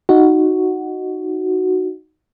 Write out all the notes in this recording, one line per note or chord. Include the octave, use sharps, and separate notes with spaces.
D#4 F#4